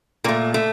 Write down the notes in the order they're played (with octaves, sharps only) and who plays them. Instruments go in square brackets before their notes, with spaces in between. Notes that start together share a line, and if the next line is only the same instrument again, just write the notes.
[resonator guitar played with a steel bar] A#2 A#3
A3
A3